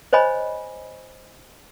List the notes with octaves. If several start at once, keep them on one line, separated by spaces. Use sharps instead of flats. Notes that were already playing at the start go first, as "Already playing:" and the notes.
C5 C#5 D#5 G#5 B5